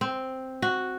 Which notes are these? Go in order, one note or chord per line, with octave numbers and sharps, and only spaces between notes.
C4
F#4